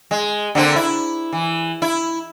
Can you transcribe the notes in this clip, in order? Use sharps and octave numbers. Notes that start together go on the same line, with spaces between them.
G#3
D3 A#3 C4
E4
E3
E4